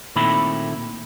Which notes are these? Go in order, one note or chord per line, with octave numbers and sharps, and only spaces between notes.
A#2 D#3 A3 C4 E4 B5